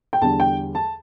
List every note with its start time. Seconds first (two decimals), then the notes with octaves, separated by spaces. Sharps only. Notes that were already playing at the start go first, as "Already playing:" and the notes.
0.13 G5
0.21 E2 D3 G3 A5
0.40 G5
0.75 A5